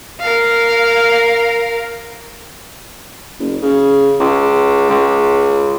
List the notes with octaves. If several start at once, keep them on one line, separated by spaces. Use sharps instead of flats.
A#4 F5
F#1
C#3
C#2
C#2